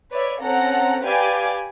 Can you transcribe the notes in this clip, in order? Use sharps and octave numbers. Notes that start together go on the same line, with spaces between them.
B4 C#5 D5 E5
C4 C#4 A4 F#5 A#5
G4 B4 D5 F5 G#5 D6